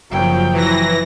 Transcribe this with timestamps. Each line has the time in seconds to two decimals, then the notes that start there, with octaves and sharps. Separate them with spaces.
0.10 F#1 F3 F#3 G5
0.53 E3 F#3 A#6